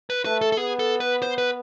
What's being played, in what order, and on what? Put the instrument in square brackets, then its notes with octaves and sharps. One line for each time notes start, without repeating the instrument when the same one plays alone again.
[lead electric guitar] B4
[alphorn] A3 [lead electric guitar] B4
[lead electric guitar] A4
A4
[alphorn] B3 [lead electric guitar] G#4
[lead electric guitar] A4
B4
C5
B4